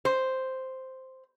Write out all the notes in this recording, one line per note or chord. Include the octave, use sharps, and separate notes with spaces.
C5